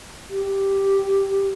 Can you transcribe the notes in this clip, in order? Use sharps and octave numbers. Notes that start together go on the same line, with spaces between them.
G4